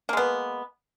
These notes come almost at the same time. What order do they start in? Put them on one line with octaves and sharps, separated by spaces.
A#3 G#3 B3